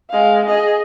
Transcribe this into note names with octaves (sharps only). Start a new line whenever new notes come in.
G#3 F5
G#4 D#5